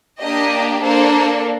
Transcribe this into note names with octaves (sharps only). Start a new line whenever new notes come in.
A#3 D4 G4 D#5
A#3 D4 A4 C5